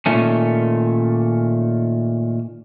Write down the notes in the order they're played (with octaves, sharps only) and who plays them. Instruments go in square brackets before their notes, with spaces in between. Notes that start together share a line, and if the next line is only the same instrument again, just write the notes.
[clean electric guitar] A#2 D#3 A3 C#4